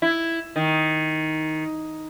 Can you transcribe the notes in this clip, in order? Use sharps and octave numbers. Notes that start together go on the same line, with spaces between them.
E4
D#3